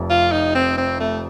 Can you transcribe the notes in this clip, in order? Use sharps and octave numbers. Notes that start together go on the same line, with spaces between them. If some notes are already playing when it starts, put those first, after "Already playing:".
Already playing: F1 F2 C3 F3
F4
D#4
C4
C4
A3